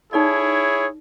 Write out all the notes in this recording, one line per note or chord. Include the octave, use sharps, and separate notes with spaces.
D#4 E4 G#4 A4 C#5 D5